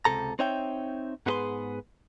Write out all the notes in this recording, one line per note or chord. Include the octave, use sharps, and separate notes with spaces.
C#2 F#2 C3 A4 A#5
C4 D#4 C#5 E5 G5
G#2 B3 E4 G#4 B4 C6